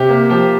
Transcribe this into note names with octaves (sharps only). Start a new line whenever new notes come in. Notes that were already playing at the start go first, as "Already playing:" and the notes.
Already playing: C3 G4
A#3
F3 G4